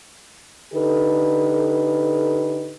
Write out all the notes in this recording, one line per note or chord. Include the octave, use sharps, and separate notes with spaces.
D3 D#4 G4 A4 B4